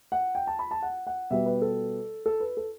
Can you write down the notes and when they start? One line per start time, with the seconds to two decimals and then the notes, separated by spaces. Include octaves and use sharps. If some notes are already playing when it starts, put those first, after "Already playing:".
0.12 F#5
0.35 G5
0.47 A5
0.59 B5
0.71 A5
0.83 F#5
1.07 F#5
1.30 B2 G3 B3 E5
1.46 B4
1.62 A4
2.26 A4
2.40 B4
2.57 A4